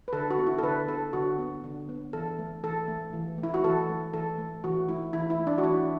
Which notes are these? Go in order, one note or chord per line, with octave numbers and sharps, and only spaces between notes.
B4
D3 A4
F#4
B3
E4
A4
D3 B4
B3 A4
D3 F#4
B3
D3
B3
E3 A4
A3
E3 A4
A3
E3
A3
E4
F#4
E3 A4
A3
E3 A4
A3
E3 F#4
A3 E4
E3 E4
E4
A3
D4
F#4
E3 E4